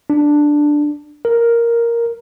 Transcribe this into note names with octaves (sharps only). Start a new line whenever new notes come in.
D4
A#4